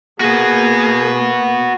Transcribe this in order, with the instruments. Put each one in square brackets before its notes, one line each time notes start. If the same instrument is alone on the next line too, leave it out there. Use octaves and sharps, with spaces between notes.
[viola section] A#3 [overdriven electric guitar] F#4 B4 [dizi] G#4